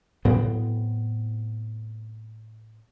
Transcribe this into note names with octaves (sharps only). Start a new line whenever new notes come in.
A2 F#3 B3 C4